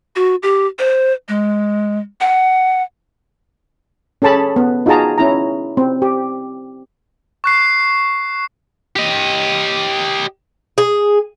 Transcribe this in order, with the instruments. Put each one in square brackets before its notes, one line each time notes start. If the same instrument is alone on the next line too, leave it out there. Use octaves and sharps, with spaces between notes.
[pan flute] F#4
G4
C5
G#3
F#5
[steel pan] C#4 G#4 A4 A5 B5
B3
D#4 F4 F#4 G#4 A5 A#5
C#4 E4 A#5
C4
G4
[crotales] C#6 F#6 C7
[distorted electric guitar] G4 D#5
[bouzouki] G#4